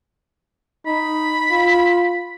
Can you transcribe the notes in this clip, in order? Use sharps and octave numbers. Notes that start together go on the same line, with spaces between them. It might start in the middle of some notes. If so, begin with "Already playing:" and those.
D#4 B5
F4